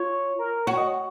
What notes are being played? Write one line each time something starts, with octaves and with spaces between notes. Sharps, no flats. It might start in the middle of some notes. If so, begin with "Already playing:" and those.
Already playing: F4 C#5
A#4
F#4 C#5
D#5
C#5